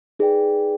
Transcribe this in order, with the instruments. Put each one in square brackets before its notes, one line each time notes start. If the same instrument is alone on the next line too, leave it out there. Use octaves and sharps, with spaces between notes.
[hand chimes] D#4 G#4 B4 D5 G5